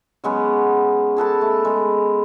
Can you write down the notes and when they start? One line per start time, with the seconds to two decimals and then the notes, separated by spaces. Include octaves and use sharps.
0.24 F#3 G#3 B3 C#4
1.17 G#4 A4 B4 A5
1.41 A3
1.65 G#3